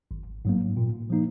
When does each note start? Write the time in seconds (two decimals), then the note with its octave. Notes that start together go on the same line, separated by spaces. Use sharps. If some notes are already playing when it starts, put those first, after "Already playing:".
0.11 G#1
0.45 G#2 F#3 A#3
0.77 A#2
1.10 F3 A#3 D#4